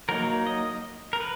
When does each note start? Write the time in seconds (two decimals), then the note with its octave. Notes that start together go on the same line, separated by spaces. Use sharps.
0.09 F#3 A#3 D#4 A#4
0.47 D#5
1.13 A#4
1.20 B4